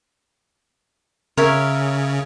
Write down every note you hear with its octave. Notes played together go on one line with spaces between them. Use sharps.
C#3 A#4 C#5 E5